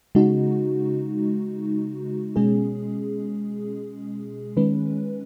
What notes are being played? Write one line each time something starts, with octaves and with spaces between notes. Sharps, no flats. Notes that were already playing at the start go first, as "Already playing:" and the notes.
C#3 G#3 D#4 F#4
B2 G#3 C#4 G#4
D#3 G#3 C#4 B4